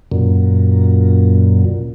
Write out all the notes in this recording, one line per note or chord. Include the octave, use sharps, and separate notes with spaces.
F#2 A#2